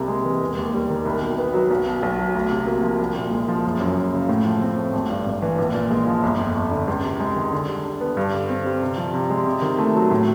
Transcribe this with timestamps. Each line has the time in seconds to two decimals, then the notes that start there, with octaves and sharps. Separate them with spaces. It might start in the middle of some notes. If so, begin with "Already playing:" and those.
Already playing: C2 C3 A#3
0.08 G#3
0.25 E3
0.41 E1
0.57 D#2
0.73 G3
0.90 D#3
1.05 C2
1.21 B2
1.38 B3
1.54 F#3
1.70 B1
1.87 B2
2.03 B1
2.19 F#3
2.35 D2
2.51 C3
2.67 A#3
2.83 F3
2.99 C2
3.16 A#2
3.31 G#3
3.48 F3
3.65 F#1
3.80 F#2
3.97 F#1
4.13 C#3
4.29 A2
4.45 F3
4.61 C4
4.77 A3
4.93 G#1
5.10 G2
5.26 G#1
5.42 E3
5.58 A#1
5.74 A#2
5.91 G#3
6.07 F3
6.23 G1
6.39 F2
6.55 G1
6.71 D3
6.88 C#2
7.03 C3
7.20 G#3
7.36 D#3
7.52 D3
7.68 G3
7.85 D4
8.01 B3
8.17 G2
8.33 D3
8.49 C4
8.66 G3
8.81 C3
8.98 F3
9.14 C3
9.30 G#3
9.46 C3
9.62 D#3
9.79 A3
9.95 F#3
10.11 A2